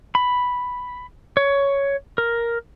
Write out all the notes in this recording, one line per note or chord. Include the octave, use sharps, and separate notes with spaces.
B5
C#5
A#4